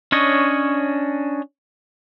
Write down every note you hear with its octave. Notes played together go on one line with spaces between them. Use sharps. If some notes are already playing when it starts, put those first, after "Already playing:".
C#4 D4 C#5 D#5